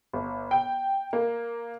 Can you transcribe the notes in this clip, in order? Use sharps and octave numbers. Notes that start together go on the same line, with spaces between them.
G1
G5
A#3